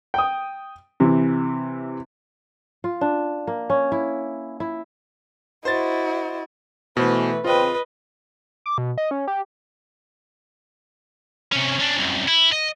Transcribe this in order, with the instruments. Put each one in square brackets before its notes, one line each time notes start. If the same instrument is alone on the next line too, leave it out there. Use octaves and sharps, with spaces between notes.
[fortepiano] G5 D#6
C3 E3
[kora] F4
D4
A#3
C#4
E4
E4
[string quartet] E4 [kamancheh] F#4 D#5 [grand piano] C5 A6
[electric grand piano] B2 C5 [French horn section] E3 A3 [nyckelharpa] B4
[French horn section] E2 C#3 C4 [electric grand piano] F4 [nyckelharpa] B4 D#5
[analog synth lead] D6
B2
D#5
C#4
G4
[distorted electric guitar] C3 C#4
C#4 D4
C2 F#2
E4
D#5